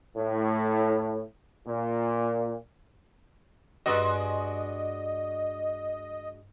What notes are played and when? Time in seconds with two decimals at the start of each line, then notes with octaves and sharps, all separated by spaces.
0.16 A2
1.67 A#2
3.86 G2 G#3 D4 F#4 B4 D#5 E6